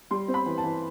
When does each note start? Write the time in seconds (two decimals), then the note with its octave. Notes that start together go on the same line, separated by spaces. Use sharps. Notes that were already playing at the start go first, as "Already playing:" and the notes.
0.11 G3 C6
0.28 C4
0.34 B5
0.46 E3
0.58 A5
0.64 E3